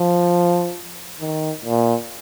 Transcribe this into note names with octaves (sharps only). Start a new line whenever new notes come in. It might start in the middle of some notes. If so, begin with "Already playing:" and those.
Already playing: F3
D#3
A#2